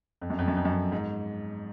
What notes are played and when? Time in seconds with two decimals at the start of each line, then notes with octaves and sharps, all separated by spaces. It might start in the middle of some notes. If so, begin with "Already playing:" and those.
0.21 F2
0.30 F#2
0.39 F2
0.48 F#2
0.57 F2
0.65 F#2
0.73 F2
0.92 G#2